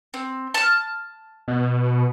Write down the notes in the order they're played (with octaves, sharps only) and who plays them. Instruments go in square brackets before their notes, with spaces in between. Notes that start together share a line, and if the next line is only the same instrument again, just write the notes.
[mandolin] C4
A5 F6
[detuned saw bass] B2